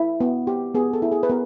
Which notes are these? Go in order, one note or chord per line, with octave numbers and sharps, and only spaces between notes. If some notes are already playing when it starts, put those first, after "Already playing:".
Already playing: E4
B3
G4
B3 G#4
A4
E4
G#4
B4
B3 A#4